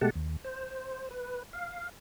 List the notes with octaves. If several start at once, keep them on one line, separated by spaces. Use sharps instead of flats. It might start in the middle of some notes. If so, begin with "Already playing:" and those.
B2 G#3 A3 G4 F#5 A5
D#2
C5
B4
F5